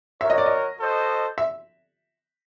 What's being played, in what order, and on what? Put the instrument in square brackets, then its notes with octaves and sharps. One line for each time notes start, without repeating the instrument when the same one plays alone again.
[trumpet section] F#4 A#4 C#5 [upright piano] E5
[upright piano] D#5
D5
D#5
[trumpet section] F#4 A4 C5 D#5
[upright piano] E5